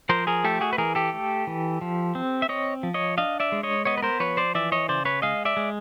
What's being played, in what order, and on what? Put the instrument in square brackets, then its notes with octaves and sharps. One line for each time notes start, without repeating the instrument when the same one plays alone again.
[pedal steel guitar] F3 A#4 C5
G#4 A#4
A3 G4 A4
F#4 G#4
B4
E3 G#4 A#4
G4 A4
A3
E3
F3
C4
E5
C4 C#5 D#5
F3
C#5 D#5
D4 D#5 F5
D5 E5
G#3
C#5 D#5
B3 C#5 D#5
B4
A#4 C5
F3 B4 C#5
C5 D5
E3 D5 E5
C#5 D#5
C#3 C5 D5
B4 C#5
G#3 D#5 F5
D5 E5
G#3